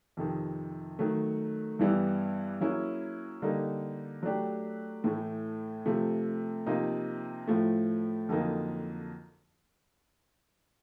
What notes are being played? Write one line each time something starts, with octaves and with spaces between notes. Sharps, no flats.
F2 C3 D#3
D#3 F#3 A3
G2 E3 G3 B3 E4
F#3 A#3 C#4 E4 G#4
D3 G3 A#3 D#4
F#3 A3 D4 G4
A2 E3 A3
C3 F3 A3
C3 F3 A#3 D#4
A2 F3 A3
F2 D3 F#3 A#3 D#4